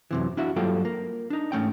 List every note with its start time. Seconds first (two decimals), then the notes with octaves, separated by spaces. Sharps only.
0.11 F#2 C3 E3
0.37 D4 E4 F#4 E5
0.56 G2 F#3 A#3 F4 A4 G5
0.85 A#3
1.30 D4 D#4
1.52 G#2 A3 C#4 G5